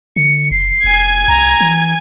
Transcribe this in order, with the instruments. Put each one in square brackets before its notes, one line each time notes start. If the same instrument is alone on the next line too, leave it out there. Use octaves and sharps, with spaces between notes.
[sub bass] D3 [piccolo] C#7
[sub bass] F#1 [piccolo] C7
[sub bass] F1 [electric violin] G#5 G#6
[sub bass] C2 [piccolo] A#5
[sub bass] E3